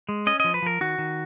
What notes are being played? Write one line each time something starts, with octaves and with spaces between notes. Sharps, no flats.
G#3
C#4 D#5
F3 D#5
B4
F3 A#4
D#3 F#4
D#3